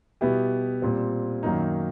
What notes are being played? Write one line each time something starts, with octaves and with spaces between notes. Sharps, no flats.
B2 G3 B3 E4 G4
A#2 G3 C4
F#2 D#3 F#3 A#3 D#4